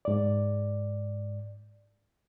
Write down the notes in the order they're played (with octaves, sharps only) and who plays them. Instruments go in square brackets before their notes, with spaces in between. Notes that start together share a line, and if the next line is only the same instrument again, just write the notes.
[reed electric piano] G#2 D5